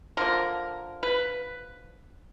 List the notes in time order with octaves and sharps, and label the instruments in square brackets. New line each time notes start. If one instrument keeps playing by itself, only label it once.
[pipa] D3 F3 A#3 A#4
B4